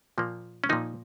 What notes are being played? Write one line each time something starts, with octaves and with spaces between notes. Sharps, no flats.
A#2 F3 A#3
C#4
A#2 F3 A#3 D#4